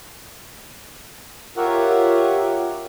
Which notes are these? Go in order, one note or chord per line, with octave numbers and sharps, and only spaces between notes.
F4 G4 A#4 C#5 E5 F#5